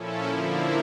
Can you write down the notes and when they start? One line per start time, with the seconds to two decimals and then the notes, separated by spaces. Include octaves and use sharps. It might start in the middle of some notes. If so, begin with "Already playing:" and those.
Already playing: A#2 F3 C#4 E4 A4
0.27 D3 F3 A#3 E4